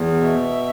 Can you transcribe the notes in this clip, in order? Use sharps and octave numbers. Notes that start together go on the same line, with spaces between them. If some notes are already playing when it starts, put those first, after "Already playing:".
Already playing: E2
B2 E5